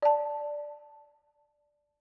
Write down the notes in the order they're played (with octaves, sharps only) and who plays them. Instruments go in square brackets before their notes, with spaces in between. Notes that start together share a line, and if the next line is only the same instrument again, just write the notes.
[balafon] D5 A5